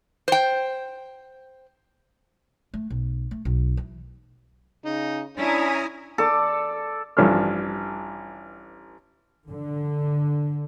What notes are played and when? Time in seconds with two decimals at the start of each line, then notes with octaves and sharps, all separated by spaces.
0.28 C5 G5
2.74 A3
2.90 B1
3.31 A3
3.45 B1
3.77 E3
4.85 C#3 D#4
5.37 C#4 D4 E4 G#5 A#5 D#6
6.18 A4 D5
7.17 A1 G2 F3 D4 A4 F6
9.49 D3